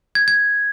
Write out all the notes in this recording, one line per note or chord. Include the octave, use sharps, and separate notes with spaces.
G#6
G#6